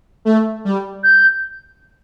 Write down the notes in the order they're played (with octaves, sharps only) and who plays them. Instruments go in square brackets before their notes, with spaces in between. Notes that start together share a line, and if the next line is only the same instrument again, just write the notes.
[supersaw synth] A3
G3
[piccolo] G6